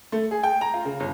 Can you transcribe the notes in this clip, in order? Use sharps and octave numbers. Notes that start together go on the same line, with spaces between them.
A3
G#4
G5
A#5
F4
C#3
G1